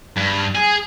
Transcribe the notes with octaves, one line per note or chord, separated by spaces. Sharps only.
G2
G#4